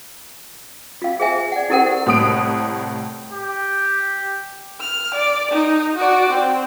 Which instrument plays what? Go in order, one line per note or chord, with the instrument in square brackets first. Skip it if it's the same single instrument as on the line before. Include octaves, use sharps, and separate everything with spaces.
[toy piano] F4 F5
G#4 C5 E5 G#5
D5 F#5
E4 G4 A4 A#4 C5 F#5
[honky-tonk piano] C2 A2 D#6 D7
[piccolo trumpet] G4
[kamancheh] F6
D5
D#4
F#4 D5
C4